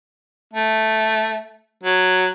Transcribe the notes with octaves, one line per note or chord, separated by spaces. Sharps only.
A3
F#3